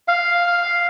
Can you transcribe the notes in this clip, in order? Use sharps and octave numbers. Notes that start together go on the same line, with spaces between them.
F5